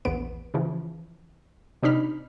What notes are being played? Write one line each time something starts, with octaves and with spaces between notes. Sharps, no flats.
A#1 E2 B3 B4 D7
C#3 E3 F3
C3 D4 D#4 B5 F6